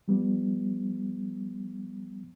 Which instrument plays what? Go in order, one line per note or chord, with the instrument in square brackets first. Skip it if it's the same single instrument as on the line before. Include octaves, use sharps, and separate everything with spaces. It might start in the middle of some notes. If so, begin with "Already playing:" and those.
[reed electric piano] F3 G3 B3